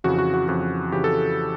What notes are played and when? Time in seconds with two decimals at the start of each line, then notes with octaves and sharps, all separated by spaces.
0.04 F2 C#3 E3 F#4
0.18 F#4
0.34 F#4
0.48 F2 C#3 E3 F#4
0.92 F2 C#3 E3 G4
1.04 A4